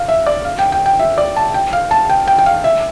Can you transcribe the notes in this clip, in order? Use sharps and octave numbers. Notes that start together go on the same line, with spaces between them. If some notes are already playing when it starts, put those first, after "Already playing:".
Already playing: F5
E5
D5
F5
G5
G5
G5
E5
D5
A5
G5
F5
A5
G5
G5
G5
F5
E5